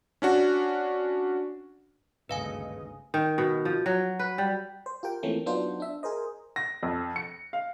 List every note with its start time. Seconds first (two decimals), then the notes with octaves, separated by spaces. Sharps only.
0.22 C#4 D4 F#4
2.29 G#1 D2 G2 C#3 B4 D#5 F5 G#5
3.14 D#3
3.38 B2
3.65 F3
3.86 F#3
4.19 B4
4.38 G3
4.86 C5
5.03 F4 G4 A#4 G5
5.23 E3 F3 A3 A#3 C4 C#4
5.46 F#3 B3 D4 D#4 F4 C5
5.80 D4 E5
6.03 G#4 A#4 C5 D#5
6.56 A#6
6.83 F2
7.16 C#7
7.53 F5